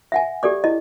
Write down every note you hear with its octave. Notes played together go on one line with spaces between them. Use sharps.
E5 F#5 G#5
G4 A4 D5 D6
E4 D#5